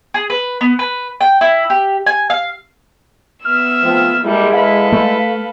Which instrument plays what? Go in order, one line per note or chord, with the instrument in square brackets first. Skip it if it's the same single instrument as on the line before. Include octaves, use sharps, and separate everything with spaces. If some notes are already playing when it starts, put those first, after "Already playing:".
[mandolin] G#4
B4
B3
B4
G5
E4
G4
G#5
F5
[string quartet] B3 E5 E6 [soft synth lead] F6
[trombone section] F3 A3 C4
[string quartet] G3 A#3 A4 [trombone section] G#3 E4
[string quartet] A4 B4 B5 [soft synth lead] F5
[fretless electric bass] A3